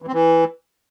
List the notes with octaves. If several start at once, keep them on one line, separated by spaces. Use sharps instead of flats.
E3
C4
E3